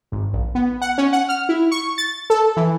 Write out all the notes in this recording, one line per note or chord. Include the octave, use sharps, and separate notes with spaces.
G#1
A#1
B3
F#5
C#4
F#5
F6
E4
C#6
A6
A4
E3